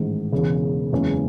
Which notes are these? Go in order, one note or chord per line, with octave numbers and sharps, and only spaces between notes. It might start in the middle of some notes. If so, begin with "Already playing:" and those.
Already playing: A1 G#2 D#3
E1 E2 C#3
F#1 E2 C#3 G#3 C#4